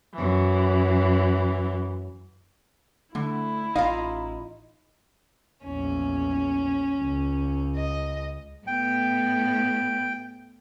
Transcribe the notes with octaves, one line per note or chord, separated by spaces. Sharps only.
F#2 E3
D3 A3 E4
A1 D#4 F4 F5 A#5
A#1 E2 C#4
C#2
D#5
A2 B3 G5